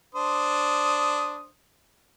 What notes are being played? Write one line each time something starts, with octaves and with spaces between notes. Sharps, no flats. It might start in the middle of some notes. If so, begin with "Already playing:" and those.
D4 C5 D#6